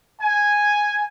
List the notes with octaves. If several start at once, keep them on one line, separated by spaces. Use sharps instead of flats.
G#5